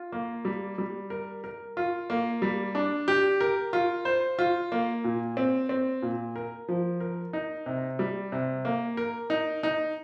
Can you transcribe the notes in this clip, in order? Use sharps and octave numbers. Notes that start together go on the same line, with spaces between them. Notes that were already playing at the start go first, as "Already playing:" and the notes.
Already playing: F4
A#3
G3
G3
A#4
A#4
F4
A#3
G3
D4
G4
A#4
F4
C5
F4
A#3
A#2
C4
C4
A#2
A#4
F3
A#4
D#4
C3
G3
C3
A#3
A#4
D#4
D#4